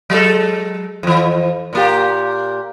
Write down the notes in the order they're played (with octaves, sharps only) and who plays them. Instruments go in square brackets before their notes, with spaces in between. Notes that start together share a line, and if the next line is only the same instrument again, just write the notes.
[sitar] F#3 G#3 A4
F2 E3
A#2 A#3 G4